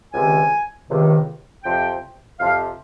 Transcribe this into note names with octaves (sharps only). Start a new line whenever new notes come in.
C#2 C3 D#3 G#5
C#2 C3 D#3
F2 C3 F3 G5
F2 C3 F3 F5